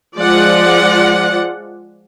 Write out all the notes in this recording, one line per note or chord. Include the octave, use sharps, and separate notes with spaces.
F3 G#3 F4 D5 F#5